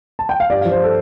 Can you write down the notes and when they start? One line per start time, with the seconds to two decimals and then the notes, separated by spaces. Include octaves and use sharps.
0.19 A5
0.29 G5
0.40 F5
0.50 G2 D5
0.61 F5
0.65 F3
0.72 C5
0.84 A4